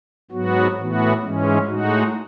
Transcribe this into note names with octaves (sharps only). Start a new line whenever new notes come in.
G#2 F#3 B3 F#4
A2 E3 B3 F#4
G#2 E3 G#3 C#4
A2 G#3 D#4 F#4